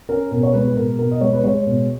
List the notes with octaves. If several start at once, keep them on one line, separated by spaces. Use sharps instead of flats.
C#4 A#4
B2 A#4
C#5
G#3 B4
B4
B2 A#4
B2 A#4
D#5
G#3 C#5
B4
G#3 C#5
B2